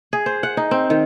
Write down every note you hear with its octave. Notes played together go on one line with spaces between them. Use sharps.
G#4
C5
F#5
D#4
C4
D#3